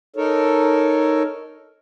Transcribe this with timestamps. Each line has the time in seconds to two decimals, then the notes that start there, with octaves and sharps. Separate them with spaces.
0.16 D#4 A4 A#4 C#5